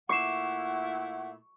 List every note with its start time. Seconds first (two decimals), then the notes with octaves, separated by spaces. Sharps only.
0.09 A#2 A3 E4 F#5 C#6 D6 C7 E7